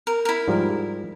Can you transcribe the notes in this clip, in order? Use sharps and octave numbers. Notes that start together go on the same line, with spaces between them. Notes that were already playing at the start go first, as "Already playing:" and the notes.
A#4
E4 A#4
G#2 F3 G3